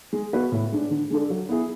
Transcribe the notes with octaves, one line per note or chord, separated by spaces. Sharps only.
G#3
B3 F#4 B4
A2
G#3 D4
D3
G#3 D4 A4
F#3
B3 E4 G#4